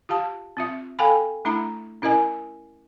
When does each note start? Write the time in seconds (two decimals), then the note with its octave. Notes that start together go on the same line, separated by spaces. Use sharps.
0.09 F4 G4 F5 A5
0.57 C4 F4 E5
0.99 A4 F5 G5 G#5 B5
1.45 A3 D4 E4 E5 A#5
2.02 C#4 E4 A#4 D#5 G#5